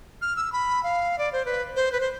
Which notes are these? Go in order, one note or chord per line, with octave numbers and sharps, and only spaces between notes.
F6
E6
B5
F5
D5
C5
B4
C5
B4
C5